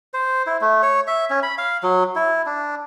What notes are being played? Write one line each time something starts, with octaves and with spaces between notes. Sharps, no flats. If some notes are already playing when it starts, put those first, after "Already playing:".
C5
E4
A3
C#5
E5
C#4
B5
F5
F#3
E4
D4